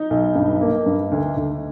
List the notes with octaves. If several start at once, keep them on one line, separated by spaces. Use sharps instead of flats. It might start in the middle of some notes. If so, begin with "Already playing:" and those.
Already playing: D#4
B1
G2
A#3
G2
D2
D2